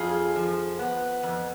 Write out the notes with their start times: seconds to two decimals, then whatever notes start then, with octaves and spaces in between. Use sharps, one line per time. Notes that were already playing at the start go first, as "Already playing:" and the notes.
Already playing: F2 F4 G#4
0.36 F3
0.79 B3
1.23 F2